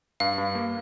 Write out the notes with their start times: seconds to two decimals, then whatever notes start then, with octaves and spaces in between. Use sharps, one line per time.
0.20 G2 F5
0.38 G2
0.55 A#3